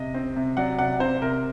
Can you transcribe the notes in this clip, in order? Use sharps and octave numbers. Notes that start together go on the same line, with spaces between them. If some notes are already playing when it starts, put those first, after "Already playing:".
Already playing: C3 D#5
C4
C3
F#3 D5 F#5
C3 D5 F#5
C4 C5
C3 A#4